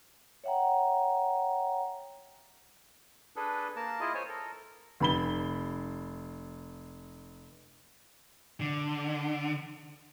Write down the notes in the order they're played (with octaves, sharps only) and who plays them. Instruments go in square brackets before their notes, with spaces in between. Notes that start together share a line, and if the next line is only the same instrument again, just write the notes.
[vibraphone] C#5 E5 F#5 G5 A#5
[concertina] D4 G#4 A4 B4
A#3 A#4 A5
E4 F4 G#4 D#5
C5 C#5 G#5
A4 A#4
[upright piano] F1 B5 G7
[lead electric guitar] D3